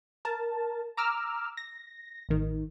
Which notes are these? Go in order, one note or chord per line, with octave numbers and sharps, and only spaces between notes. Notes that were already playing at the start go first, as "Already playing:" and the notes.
A#4 A5
A#5 D6 E6 F6
A#6
A1 D#3